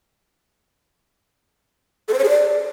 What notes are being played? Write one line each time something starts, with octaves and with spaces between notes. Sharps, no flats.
A4
C5
C#5
G#4
D5